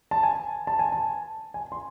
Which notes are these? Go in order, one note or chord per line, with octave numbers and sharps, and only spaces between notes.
A5
G#5
A5
G#5
A5
G#5
C6